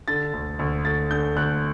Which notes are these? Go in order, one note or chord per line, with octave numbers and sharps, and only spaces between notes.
D3 A6
D2
D2
D2 A6
D3 G6
D2 F#6